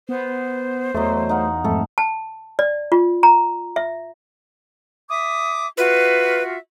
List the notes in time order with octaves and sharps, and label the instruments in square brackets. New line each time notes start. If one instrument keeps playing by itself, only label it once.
[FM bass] B3 [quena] C5
[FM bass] E2 [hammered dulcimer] F#3 D#5 C6 [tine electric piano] A3
[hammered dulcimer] D#4 F5 F#5
[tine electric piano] F2 G#2 A3 [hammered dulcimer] A4
[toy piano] A5
D5
F4
A#5
E5
[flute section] E5 D6 D#6
[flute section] F4 F#4 E5 [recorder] B4